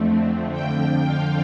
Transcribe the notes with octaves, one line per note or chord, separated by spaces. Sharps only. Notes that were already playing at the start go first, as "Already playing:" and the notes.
Already playing: F2 D3 A3 C4
F2 D3 F3 G5
F5